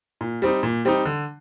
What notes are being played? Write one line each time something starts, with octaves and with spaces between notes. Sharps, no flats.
A#2
G3 C4 D#4
A#2
G3 C4 D#4
D3